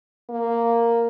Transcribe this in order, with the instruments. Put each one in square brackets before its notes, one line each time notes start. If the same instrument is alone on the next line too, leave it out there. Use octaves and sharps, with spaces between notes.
[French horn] A#3